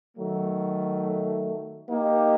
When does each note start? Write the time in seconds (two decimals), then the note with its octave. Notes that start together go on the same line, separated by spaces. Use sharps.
0.16 D#3 F#3 A3
1.88 A#3 D#4 G4